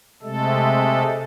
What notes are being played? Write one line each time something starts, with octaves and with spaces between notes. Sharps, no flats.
C3 G#3 A3 A4